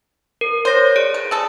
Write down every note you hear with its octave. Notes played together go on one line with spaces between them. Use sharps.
A#4
C5 C#5 A#6
G#4 D5 D7
B4
G#4 A4